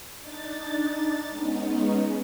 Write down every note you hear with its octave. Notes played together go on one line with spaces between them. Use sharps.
D4 D#4 A6
G#3 B3 C#4 D#4